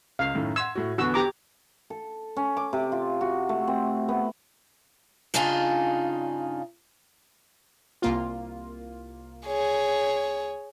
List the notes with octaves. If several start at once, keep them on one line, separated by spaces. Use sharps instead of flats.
C#2 F5
F#2 A2 D#3
F#5 C6 E6 G#6
A2 F#4
E2 D3 B3 F#4 E6
G4 A#5 D6
A4
C#4
D6
C3
F4
F#4
A3
C4
B3
G2 C#3 D4 D#4 F4 G#4
C2 A#3 F4
G#4 C#5